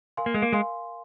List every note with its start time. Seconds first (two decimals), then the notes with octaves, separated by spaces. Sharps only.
0.17 A#4 F5 G#5 C6
0.26 A#3
0.34 G#3
0.42 A#3
0.52 G#3 A#4 F5 G#5 C6